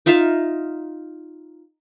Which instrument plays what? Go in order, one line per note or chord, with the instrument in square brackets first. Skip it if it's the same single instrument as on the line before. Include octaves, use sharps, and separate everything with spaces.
[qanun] D#4 F4 E5 F5